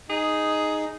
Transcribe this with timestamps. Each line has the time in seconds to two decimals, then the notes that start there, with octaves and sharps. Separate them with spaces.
0.10 D#4 G#4